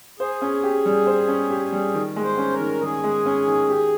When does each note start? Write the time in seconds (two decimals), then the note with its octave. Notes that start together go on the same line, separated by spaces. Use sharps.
0.20 G#4 C5
0.42 C#4
0.63 G4
0.85 G3
1.07 C5
1.28 C#4
1.50 G4
1.72 G3
1.94 D#3
2.16 G#3
2.24 C5
2.38 C#4
2.52 A#4
2.60 D#3
2.81 D#3 G#4
3.04 G#3
3.26 C#4
3.47 D#3
3.69 G4